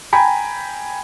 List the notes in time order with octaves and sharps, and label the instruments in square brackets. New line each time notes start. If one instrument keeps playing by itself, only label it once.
[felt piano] G5 G#5 A#5 B5